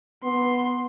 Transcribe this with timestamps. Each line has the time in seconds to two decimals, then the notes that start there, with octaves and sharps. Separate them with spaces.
0.23 B3 C6